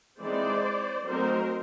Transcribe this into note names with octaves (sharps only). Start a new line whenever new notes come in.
E3 G#3 C4 D#4 C5 D5
F#3 A3 C4 D#4 A#4 C5